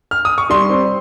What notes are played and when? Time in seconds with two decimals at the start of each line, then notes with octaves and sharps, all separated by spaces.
0.11 F6
0.25 D#6
0.38 C#6
0.50 G3 C6
0.70 C4